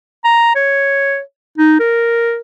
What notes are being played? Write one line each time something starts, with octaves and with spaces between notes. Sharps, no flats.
A#5
C#5
D#4
A#4